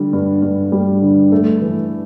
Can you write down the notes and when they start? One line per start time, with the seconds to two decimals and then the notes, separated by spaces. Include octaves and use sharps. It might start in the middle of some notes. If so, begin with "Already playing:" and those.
Already playing: D3 G3
0.13 G2
0.43 G2
0.72 G3
1.02 D3
1.32 A3
1.62 E3